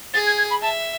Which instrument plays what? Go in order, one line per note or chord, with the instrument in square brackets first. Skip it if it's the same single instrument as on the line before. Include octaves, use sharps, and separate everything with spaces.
[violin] G#4 [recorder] A6
[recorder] G#6
G#6
B5
[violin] E5 [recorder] A5